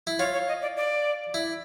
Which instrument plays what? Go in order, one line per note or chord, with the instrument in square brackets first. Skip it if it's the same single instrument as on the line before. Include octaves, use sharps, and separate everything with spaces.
[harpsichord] E4
[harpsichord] F4 [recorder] C#5
[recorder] C#5
D#5
D5
D5
[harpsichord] E4